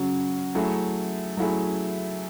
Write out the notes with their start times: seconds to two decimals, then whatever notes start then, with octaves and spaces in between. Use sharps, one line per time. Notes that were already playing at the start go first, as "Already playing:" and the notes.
Already playing: C#3 F#3 C#4 F#4
0.55 F#3 A3 E4 G#4
1.37 F#3 A3 E4 G#4